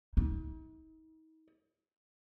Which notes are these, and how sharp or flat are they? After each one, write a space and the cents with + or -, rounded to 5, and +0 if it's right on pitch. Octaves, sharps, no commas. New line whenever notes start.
D#4 +40